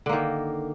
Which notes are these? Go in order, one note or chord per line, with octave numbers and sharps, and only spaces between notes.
D3 D#3 A#3